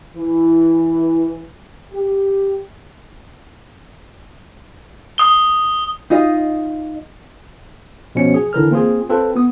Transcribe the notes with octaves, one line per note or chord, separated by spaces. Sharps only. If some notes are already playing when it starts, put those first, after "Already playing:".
E3
G4
D#6 G7
D#4 F4 D#5
B2 F3 C#4 C#7
G#4
D3 E3 A#4 F6
A#3 C4 F4 G#4
C4 F4 A4 B4
B3 D#6